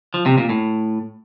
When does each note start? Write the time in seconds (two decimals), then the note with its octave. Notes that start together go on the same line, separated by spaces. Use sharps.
0.14 F3
0.26 C3
0.38 A#2
0.50 A2